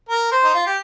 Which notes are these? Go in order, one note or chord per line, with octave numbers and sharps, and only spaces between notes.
A#4
C5
D#4
F4
G4